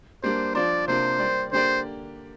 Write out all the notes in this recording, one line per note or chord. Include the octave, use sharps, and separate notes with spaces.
G3 A#3 D4 C5
F3 D4 F4 C5 D5
C3 A#3 D4 F4 C5
G3 A#3 G4 D5
D3 A#3 G4 C5 D5